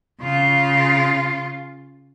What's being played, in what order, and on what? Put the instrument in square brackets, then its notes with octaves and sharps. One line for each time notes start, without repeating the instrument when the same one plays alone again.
[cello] C#3 F4